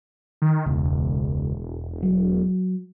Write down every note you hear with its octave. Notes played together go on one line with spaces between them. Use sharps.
D#3
E1 C#2
F#3